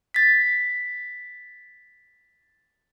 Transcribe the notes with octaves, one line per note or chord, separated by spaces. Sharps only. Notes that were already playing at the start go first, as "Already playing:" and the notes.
A6 B6